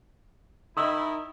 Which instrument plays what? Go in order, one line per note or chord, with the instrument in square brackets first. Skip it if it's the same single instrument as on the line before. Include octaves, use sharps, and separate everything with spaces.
[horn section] D#3 D#4 E4 [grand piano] D#6 E6